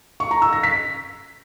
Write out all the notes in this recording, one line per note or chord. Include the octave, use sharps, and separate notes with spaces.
C#6
A#5
E6
A#6
B6